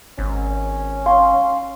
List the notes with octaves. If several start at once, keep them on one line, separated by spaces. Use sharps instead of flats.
G#1 C#4
F5 C6 C#6